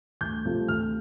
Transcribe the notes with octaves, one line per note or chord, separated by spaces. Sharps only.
D2 G6
C3 F3 A3
D2 F6